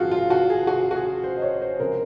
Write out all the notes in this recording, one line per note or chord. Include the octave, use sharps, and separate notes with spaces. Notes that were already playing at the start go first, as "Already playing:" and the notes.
Already playing: G#1 F#2 F3 F4 F#4 G#4
F4
F#4
G#4
F#4
F#4
G#4
C5
D#5
C#5
C5
C#2 C3 F3 A#4